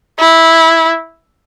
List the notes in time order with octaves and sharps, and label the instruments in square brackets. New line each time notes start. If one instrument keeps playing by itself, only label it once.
[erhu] E4